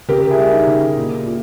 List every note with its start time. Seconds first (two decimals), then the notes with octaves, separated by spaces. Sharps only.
0.08 C#3 G4 A#4
0.31 E4 G#4
0.38 G3
0.52 D#4 G4
0.67 C#3
0.96 A#2
1.26 A#2